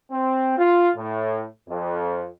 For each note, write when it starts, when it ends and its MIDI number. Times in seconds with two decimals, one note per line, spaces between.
0.11 0.56 60
0.58 0.89 65
0.97 1.44 45
1.69 2.27 41